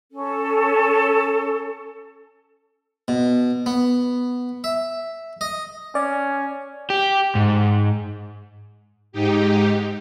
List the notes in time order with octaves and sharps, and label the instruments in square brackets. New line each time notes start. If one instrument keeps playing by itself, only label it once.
[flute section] C#4 A4
[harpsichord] B2
B3
E5
D#5
[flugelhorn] C#4 [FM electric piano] D5
[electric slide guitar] G4
G#2
[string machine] G#2 D#4 G4